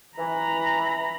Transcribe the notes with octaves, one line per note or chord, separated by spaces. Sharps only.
E3 A#5 B5